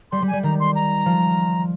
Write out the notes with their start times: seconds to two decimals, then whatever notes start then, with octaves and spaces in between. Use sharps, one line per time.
0.11 G3 C6
0.22 G3
0.28 G#5
0.33 G3
0.43 D#3 A#5
0.60 C6
0.75 A#5
1.06 F3